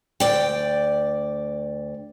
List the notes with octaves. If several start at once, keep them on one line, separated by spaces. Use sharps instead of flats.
D2 D5 G5